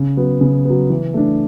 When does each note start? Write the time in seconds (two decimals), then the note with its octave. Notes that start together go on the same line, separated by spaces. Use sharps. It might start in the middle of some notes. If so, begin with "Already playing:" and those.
Already playing: C#3
0.17 F#3 B3
0.41 C#3
0.65 F#3 B3
0.90 E3
1.14 A3 D4